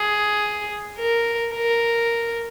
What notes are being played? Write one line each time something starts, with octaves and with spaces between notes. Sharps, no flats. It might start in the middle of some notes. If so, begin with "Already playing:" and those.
Already playing: G#4
A#4
A#4